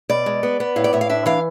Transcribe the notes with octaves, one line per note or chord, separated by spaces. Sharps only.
B2 D5
G#3
B3
B3
A2 F5
D5
A2 E5
F5
D4 E5
E3 F5